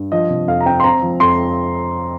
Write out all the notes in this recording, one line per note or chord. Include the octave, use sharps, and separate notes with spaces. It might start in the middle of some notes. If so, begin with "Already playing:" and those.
Already playing: G2
F3 D#5
C3
F2 F5
A#5
C4 G5
C6
C4 A#5
F3
F2 C6